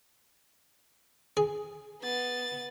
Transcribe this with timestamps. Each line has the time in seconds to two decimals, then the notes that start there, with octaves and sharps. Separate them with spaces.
1.37 G#4
2.01 B3 A6